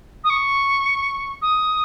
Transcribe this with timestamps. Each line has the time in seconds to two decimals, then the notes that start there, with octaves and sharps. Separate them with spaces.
0.24 D#6
0.29 C#6
1.41 D#6